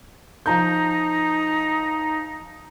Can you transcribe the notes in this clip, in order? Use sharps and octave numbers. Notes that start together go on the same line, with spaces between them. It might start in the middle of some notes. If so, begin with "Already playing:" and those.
F3 D#4 A#5 G6